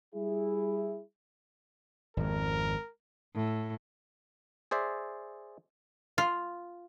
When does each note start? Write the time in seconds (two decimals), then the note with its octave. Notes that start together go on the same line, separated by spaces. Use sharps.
0.14 G3 E4 G#4
2.17 G#1 F2 A#4
3.35 A2
4.71 G#4 C5 D5 E5
6.18 F4